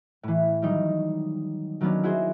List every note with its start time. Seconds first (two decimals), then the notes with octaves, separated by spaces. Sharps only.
0.23 A2 E3
0.62 D#3 F#3 G3 D#4
1.81 D#3 F#3 A#3 B3 C#4 D4
2.03 E4 F#4 G#4 C5